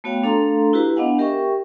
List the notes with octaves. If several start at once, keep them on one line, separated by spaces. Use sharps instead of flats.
A3 B3 F#4 C#5 F5 G5
A3 D4 A4 F5 A#5 C6
E4 F#4 G4 B4 A#5
B3 D4 D#5 F5 F#5 G#5
G4 A#4 E5 G5 C#6